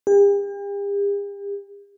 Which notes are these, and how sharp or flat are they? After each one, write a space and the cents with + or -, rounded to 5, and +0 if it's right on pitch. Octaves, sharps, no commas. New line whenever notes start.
G4 +45